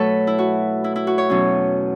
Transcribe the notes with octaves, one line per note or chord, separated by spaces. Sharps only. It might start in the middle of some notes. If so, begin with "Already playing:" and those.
Already playing: B2 F#3 A3 A4 B4 C#5
E4
F#4
E4
E4
F#4
C#5
E2 B2 F#3 C#4